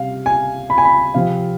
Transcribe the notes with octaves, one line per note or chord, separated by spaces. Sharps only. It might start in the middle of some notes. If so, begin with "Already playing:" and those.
Already playing: C3 G3 F5
G#5
B5
G#5
B5
C3 F3 C4 F5